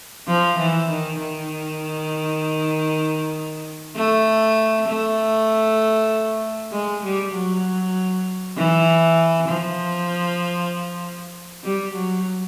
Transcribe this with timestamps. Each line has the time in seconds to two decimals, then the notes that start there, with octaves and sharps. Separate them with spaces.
0.27 F3
0.59 E3
0.90 D#3
1.19 D#3
3.96 A3
4.87 A3
6.72 G#3
7.04 G3
7.34 F#3
8.57 E3
9.48 F3
11.63 G3
11.94 F#3